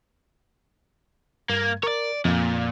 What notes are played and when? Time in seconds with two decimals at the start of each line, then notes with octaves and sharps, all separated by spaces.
1.49 G2 A#3 G#6
1.83 A#4 C#5 D5
2.25 F2 A#2